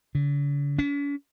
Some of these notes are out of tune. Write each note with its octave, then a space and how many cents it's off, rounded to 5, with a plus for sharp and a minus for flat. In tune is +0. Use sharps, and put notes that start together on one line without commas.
D3 -45
C#4 +45